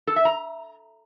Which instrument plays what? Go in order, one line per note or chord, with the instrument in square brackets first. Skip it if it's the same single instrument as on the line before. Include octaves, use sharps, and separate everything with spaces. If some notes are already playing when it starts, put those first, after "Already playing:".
[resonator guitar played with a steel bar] A4
E5
A#5